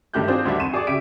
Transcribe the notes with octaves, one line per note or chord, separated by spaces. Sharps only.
G2 D#3 A3 G4 F#6 G6
C4 D4 F4 G#4 C5
D2 D#3 G3 D4 E5
F2 C6 C#6 D#7 E7
G#4 D5 C#6 D6
C#3 F#4 G4 E5 B6 D7